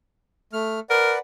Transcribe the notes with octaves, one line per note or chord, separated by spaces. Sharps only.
A3 F6
A#4 B4 D5 F#5